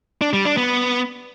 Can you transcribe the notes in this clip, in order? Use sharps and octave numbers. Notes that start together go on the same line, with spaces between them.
D4
G3
D4
B3